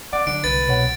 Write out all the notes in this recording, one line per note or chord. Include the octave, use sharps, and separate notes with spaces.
C4 D5 F#5
D3 F#3 D4 D7
C2 F#3 B4 A6
B2 C#5 F#5